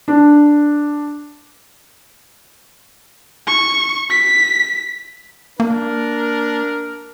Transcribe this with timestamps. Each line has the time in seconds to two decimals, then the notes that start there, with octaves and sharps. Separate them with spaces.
0.08 D4
3.47 C#6
4.10 B6
5.60 A#3 D4 A#4